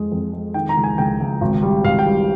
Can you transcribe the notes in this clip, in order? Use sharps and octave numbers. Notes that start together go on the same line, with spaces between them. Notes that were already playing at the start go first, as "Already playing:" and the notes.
Already playing: F2 G#3
F2
G#3
D#3 G5
A#5
C#2
G#5
C#2 G5
C#2
G#1
G3
G#1 F5
G5
G3